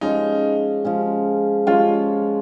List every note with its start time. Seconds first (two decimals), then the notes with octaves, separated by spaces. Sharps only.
0.01 F3 G#3 C#4 D#4
0.85 F3 G#3 C#4
1.67 F3 G#3 C#4 F4